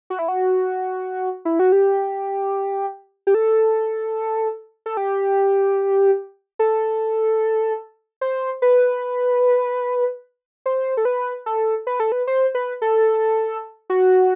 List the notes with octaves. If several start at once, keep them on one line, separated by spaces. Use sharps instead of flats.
F#4
E4
F#4
E4
F#4
G4
G4
A4
A4
G4
A4
C5
B4
C5
A4
B4
A4
B4
A4
B4
C5
B4
A4
F#4